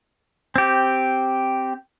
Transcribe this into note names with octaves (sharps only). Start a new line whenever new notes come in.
C4 G4